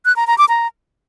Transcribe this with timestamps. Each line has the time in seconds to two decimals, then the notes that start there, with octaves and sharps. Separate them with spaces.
0.05 F#6
0.16 A#5
0.27 A#5
0.38 D6
0.49 A#5